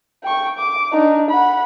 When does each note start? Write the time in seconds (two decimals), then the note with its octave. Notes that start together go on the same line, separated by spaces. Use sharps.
0.24 G5 C#6
0.58 D6
0.93 D4 D#4
1.30 F#5 B5